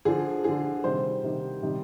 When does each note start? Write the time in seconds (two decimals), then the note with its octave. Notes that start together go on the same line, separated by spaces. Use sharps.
0.05 D3 F3 G#4
0.44 D3 F3 G#4
0.84 C3 D#3 G3 C5
1.23 C3 D#3 G3
1.62 C3 D#3 G3